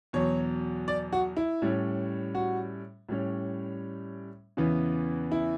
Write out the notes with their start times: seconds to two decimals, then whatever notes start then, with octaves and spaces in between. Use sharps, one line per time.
0.13 E2 B2 F#3 C#5
0.88 D5
1.13 F#4
1.37 E4
1.62 A2 G3 C#4
2.35 F#4
3.09 A2 G3 C#4
4.57 E2 C#3 E3 B3
5.32 E4